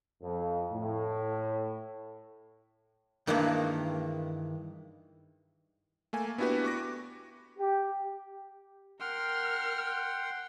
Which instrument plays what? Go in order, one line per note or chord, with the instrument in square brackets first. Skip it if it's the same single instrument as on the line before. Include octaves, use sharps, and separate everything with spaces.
[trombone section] F2
A2
[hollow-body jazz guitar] G2 D#3 E3 G#3 A#3 D4
[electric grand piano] A3 A#3 G#5
B3 D4 E4 F#4 G4 B4
C#6 D6 A#6
[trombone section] G4
[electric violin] A#4 F6 [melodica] F#5 G5 C6